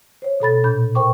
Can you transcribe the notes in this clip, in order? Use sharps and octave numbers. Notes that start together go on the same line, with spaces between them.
C5 C#5
B2 A4 B5 A6
A#2 D4 B5 G6
A#4 C5 G5 C#6 D6